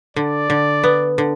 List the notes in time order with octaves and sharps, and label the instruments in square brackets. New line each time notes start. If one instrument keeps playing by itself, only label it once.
[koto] D3 [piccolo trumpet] D5
[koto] D3
B3
D3